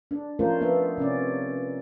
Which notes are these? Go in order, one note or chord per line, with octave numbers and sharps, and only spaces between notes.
D4
F3 A3 C#4 F4 A#4 C5
F3 B3 D4 E5
C3 C#4 D5